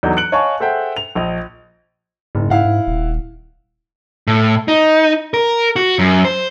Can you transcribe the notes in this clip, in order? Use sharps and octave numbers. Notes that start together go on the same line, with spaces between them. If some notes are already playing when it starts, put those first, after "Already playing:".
E2 F#3 D4 D#4 A4 G6
F#6 C#7 D7 F#7
C#5 D#5 F5 G#5 A5 C#6
G#4 A4 C5 E5 F#5 G5
F7
A#1 D#5
F#1 G#2
G#2 E4 F5 F#5
G#2
D#1
A2
D#4
A#4
F#4
F#2
C5